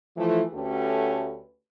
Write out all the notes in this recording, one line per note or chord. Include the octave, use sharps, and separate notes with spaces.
E3 F3 A3
D2 A3 C#4 F#4 G4 B4